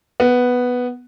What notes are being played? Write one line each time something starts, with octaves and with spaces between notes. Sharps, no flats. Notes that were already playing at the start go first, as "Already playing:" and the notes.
B3